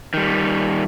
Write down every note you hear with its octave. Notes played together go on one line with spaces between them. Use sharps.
D#3 G3